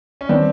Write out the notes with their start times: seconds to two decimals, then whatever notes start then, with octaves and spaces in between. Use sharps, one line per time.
0.21 C#4
0.29 D#3 G3 B3 C4 D4